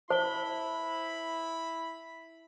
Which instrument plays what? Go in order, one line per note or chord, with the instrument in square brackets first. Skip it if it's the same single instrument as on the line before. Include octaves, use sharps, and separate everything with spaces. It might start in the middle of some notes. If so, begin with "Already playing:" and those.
[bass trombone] E4 [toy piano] C5 [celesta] A5 G7 [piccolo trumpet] B5